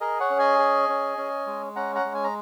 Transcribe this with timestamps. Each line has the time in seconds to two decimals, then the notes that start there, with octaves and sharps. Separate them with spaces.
0.01 G#4 A#4 D#5
0.20 C#5 F#5
0.30 C#4
0.39 D#5 G#5
0.59 G#4
0.89 C#4
1.18 C#4
1.47 G#3
1.76 C#4 F#5 A#5
1.95 F#5 A#5
2.05 G#3
2.14 G#5
2.24 A#5